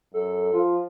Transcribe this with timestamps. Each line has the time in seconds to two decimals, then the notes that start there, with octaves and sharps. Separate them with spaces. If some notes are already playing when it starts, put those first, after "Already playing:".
0.14 F#2 A4
0.53 F3 F4